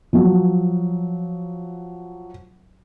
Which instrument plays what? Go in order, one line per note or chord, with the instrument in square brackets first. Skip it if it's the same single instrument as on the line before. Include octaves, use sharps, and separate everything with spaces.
[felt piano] F3 F#3